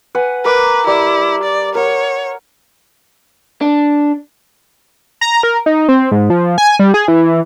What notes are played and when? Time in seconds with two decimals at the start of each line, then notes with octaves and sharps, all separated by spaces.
0.15 B4 F#5 G#5
0.45 A#4 B4 A#5 D6
0.87 G3 E4 D6
1.43 D5
1.75 A#4 C#5 F#5
3.61 D4
5.21 A#5
5.43 A#4
5.66 D#4
5.89 C4
6.12 G#2
6.30 F3
6.58 G#5
6.79 G3
6.94 G#4
7.08 E3